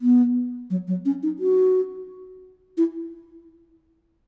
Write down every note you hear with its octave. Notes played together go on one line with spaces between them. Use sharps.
B3
F#3
F#3
C#4
D#4
F#4
E4